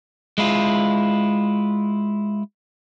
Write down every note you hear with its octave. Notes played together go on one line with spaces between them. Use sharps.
G#3 E4 F4